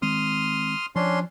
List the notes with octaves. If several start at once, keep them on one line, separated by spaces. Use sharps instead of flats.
D#3 G#3 C4 C6 D#6 F6
F3 C#4 D4 C6